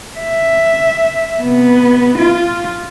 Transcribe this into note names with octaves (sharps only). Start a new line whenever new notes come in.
E5
C3 B3
F4